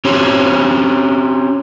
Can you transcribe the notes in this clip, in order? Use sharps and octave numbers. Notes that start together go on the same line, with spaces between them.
C4 C#4 G4 C5 C#5